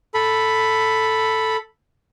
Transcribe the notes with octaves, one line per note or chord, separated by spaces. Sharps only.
A4 B5